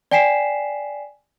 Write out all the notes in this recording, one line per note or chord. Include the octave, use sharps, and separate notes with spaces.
D5 G5 G#5 B6 C7 E7